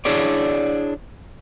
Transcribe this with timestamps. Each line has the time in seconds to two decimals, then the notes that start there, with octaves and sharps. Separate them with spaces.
0.05 D4 E4 G#4 C#5 D5